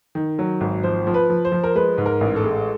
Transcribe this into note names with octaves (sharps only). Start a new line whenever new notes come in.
D#3
F#3
G#1
F3 C5
F3
B4
F3
C5
F3
A#4
G#3 B4
G#2
A#4
A1
A4
G#3